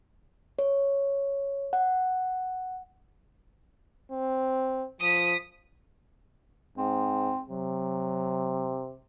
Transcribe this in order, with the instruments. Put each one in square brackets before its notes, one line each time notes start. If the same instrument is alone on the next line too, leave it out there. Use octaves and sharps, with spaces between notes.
[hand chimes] C#5
F#5
[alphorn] C4
[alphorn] F3 [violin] D#6 B6
[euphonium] G#2 [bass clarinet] C4
[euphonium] C3 [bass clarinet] F#3